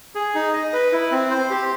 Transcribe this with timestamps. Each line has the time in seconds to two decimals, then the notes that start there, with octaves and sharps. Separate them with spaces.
0.15 G#4
0.35 D#4
0.53 D#5
0.73 B4
0.92 E4
1.12 C4
1.30 C5
1.50 G4